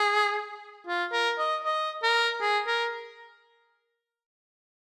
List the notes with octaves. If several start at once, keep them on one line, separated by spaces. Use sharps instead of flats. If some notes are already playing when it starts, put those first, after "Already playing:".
Already playing: G#4
F4
A#4
D#5
D#5
A#4
G#4
A#4